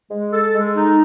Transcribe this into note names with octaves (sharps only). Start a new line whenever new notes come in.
G#3
A4
G#3
D#4